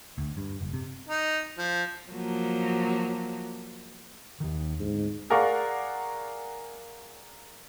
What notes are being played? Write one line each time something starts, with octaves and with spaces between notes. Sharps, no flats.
D2
G2
F#1
C3
D#4
F3
F3 F#3 A#3
D#2 D#3
D1 G#2
G#4 A#4 D5 F5 F#5 C#6